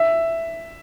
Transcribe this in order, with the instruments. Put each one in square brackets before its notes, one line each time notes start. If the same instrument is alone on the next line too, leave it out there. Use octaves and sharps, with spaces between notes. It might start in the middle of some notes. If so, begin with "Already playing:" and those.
Already playing: [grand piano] E5